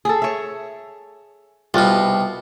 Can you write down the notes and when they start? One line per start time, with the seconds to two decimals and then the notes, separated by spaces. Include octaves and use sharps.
0.05 G#4 A4
0.22 C#5 E5
1.74 C2 B2 F4 F#4